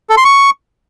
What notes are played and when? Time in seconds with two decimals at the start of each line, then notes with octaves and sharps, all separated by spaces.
0.10 A4
0.17 C6
0.25 C#6